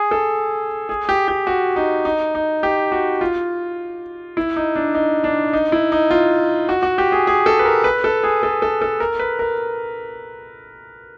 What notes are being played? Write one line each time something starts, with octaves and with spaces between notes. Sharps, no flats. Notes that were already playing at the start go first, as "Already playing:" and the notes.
Already playing: G#4
A4
G#4
G4
G4
F#4
D#4
D#4
D#4
G4
F#4
F4
E4
D#4
D4
D#4
D4
D#4
E4
D#4
F4
F#4
F#4
G4
G#4
G#4
A4
B4
A#4
B4
A4
G#4
A4
A4
A4
A#4
B4
A#4